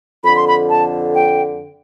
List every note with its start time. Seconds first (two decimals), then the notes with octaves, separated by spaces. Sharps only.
0.24 F2 D3 B5
0.35 C6
0.47 B5
0.69 A5
1.14 G5